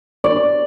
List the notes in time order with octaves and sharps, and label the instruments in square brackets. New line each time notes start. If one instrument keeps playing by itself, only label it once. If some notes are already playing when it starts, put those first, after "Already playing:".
[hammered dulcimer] D5